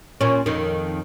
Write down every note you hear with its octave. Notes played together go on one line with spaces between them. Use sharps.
A#2 C#4
F2 D#3